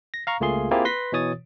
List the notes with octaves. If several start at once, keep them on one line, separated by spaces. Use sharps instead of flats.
A#6
F5 A#5 C#6
C#2 A3 A#3 F4 G#4 C6
A#3 C4 E4 F4 G4 G#4
B4 C6 A#6 B6
B2 E3 C#5 D#6 A6